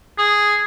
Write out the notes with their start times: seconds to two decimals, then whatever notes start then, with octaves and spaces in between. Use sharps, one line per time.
0.18 G#4